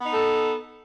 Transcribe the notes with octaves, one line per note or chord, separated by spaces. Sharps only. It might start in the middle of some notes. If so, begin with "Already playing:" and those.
B3 D#4 A4